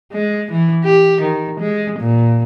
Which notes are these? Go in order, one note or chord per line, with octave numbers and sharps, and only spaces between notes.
G#3
E3
G4
D#3
G#3
A#2